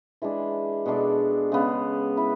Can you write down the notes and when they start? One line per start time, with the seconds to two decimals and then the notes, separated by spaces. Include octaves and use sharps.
0.22 E3 G#3 D4
0.86 B2 G#3 D4 A4
1.52 C#3 G#3 B3
2.17 E4 B4